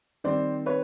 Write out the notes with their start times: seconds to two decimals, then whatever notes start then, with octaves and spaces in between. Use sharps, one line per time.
0.24 D#3 G3 C4 C5 D5
0.66 B4 C#5